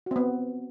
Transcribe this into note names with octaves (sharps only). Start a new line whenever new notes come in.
B3 C4 F#4